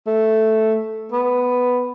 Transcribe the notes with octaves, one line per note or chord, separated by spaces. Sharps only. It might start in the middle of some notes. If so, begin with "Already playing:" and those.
A3
B3